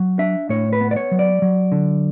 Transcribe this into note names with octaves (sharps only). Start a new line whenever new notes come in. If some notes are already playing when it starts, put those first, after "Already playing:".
Already playing: F#3
D4 E5
A2 C#5
B4
B3
D5
C#5
F#3
D5
F#3
D3